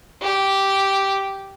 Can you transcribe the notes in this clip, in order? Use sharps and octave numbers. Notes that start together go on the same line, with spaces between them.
G4